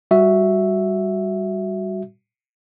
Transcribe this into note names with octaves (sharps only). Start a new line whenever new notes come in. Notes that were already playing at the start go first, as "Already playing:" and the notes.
G3 F#4 E5